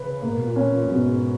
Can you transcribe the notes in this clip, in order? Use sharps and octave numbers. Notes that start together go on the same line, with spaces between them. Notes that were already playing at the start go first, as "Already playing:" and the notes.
Already playing: C#3 B4
G#2 A#3
B2
A#2
C#4
A#2
F#2
G#2 B2